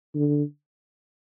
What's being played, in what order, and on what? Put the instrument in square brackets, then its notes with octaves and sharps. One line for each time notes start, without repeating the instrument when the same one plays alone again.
[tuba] D3